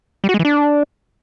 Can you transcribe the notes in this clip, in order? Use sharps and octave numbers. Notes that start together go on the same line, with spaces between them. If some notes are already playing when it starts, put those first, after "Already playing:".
G3
F#4
G#3
E3
D4